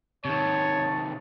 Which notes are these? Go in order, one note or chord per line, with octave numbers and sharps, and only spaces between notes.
C3 D#3 C#5 A5